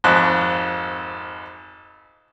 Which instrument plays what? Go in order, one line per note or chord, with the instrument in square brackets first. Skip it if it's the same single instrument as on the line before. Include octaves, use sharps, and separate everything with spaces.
[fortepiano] G#1 F2 F#6